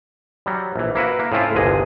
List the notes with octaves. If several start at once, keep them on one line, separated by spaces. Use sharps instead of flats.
F#3 G3
A#1 E3
A#3 E4 F#4 B4
A#3
A2 C#3 C4 E4 F4
G1 C2 A#2 D3 G#4 D#5